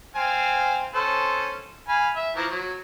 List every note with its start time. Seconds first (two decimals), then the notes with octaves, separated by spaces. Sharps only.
0.15 C4 F5 G#5
0.94 C#4 A4 C5
1.88 F5 G#5 B5
2.16 E5
2.36 E3 F3 A#4
2.50 F#3